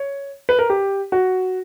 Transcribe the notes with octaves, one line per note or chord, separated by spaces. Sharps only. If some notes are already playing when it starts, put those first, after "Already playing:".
Already playing: C#5
B4
A#4
G4
F#4